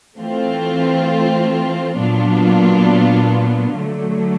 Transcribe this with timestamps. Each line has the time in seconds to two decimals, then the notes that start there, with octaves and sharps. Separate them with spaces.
0.17 E3 A3 C4 F4
1.96 A#2 F#3 B3 D4 F4
3.75 D3 F#3 A3